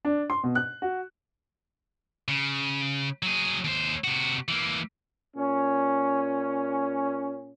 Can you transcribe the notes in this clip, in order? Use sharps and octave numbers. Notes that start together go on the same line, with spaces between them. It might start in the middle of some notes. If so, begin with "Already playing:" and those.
D4
C6
B2
F#6
F#4
C#3
F#3 G#4
D#2 C5
C3 F#4
E3 A#3
A#2 C#4